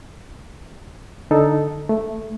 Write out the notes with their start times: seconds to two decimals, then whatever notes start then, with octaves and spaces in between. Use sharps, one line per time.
1.31 D3 D#4 A4
1.89 A3